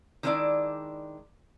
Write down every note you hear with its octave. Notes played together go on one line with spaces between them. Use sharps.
D#3 G#3 C4 D4 E4 D5